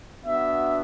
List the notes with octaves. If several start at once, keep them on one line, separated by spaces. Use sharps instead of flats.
B3 D4 F#4 E5